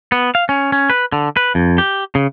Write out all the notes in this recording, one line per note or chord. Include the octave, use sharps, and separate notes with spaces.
B3
F5
C#4
C#4
B4
D3
B4
F2
G4
C#3